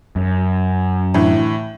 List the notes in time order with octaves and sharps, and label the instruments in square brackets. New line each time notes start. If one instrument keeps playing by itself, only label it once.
[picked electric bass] F#2
[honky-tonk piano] A2 D3 E3